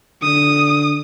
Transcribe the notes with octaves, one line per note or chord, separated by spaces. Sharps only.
D3 D#6